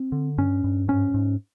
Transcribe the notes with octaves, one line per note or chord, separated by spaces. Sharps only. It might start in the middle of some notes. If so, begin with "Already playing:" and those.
Already playing: C4
D3
G2 C#4
G2
G#2 C#4
G#2